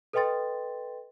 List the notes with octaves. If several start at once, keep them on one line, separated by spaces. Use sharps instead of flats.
A4 B4 D#5 G5 C6 A6